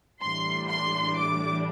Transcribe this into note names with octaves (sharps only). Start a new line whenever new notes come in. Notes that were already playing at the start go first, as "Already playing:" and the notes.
A2 E3 G3 D4 C6
C6
D6